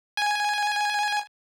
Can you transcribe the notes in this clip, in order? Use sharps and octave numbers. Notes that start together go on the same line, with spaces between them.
G#5